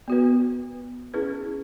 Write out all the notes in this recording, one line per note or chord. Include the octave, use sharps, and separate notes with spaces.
B3 F#4 B4
C#4 E4 G#4 B4